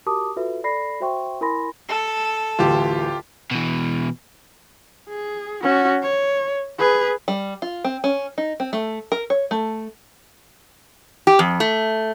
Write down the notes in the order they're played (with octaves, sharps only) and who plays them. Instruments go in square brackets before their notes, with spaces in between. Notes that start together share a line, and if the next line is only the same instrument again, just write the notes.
[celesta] F#4 G4 A#4 A5 D6 D#6
F4 F#4 A4 B4 E5
A4 D5 B5 A#6 C7
F#4 C5 E5 G5 C6 C#6
E4 A#4 G#5 B5 C6 A#6
[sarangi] A4
[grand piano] D1 A1 D2 [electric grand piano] F4 G4
[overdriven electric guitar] B2 E3
[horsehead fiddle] G#4
C#4 F#4
C#5
G#4 B4
[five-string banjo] G3
F4
C4
C#4
D#4
C4
A3
A#4
C#5
A3
[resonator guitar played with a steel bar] G4
F2
A3